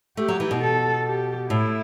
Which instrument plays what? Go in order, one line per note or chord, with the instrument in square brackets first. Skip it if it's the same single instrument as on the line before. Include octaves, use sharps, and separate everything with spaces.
[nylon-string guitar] A3 [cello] G4
[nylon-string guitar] F#3
E3
B2
[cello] A4
G4
[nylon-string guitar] A2 [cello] E4